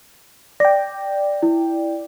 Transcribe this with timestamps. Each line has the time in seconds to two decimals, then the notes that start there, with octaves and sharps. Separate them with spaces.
0.60 D5 G5 A#6
1.42 E4